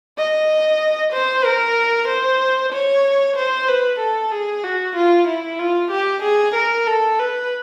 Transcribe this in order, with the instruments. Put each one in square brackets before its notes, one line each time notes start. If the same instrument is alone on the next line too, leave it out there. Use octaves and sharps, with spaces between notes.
[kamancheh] D#5
C5
A#4
C5
C#5
C5
B4
A4
G#4
F#4
F4
E4
F4
G4
G#4
A#4
A4
B4